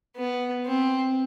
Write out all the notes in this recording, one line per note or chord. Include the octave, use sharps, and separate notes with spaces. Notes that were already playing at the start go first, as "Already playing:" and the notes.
B3
C4